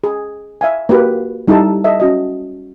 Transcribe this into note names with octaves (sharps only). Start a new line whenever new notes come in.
G#4
E5 F5 G#5
A#3 F#4 G4 B4
G3 D#4 E4 G4 A4 A5
A4 D#5 E5
C#4 F#4 D#5